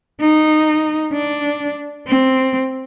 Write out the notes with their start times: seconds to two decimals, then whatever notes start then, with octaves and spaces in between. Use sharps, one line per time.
0.21 D#4
1.13 D4
2.07 C4